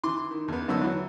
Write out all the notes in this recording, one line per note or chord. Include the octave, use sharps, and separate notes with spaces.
E3 C6 D6
D#3
E2 B3
D3 D#3 F#3 B3 D#4 E6
E3 F#3